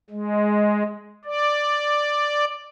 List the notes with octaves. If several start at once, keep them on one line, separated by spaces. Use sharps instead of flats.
G#3
D5